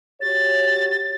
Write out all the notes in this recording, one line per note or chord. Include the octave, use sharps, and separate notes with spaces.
F#4 G4 C#5 A6